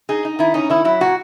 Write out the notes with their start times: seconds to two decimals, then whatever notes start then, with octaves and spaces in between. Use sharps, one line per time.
0.09 D#4 G#4
0.25 D#4
0.39 D#3 E4
0.54 C#4 D#4
0.70 D#3 E4
0.85 F#3 E4
1.01 A#2 F#4